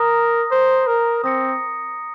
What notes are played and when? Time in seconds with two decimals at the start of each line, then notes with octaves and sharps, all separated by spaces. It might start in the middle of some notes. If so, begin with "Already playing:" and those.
Already playing: A#4 A#5 D#6 A#6
0.51 C5
0.87 A#4
1.24 C4 D#6 A#6 C#7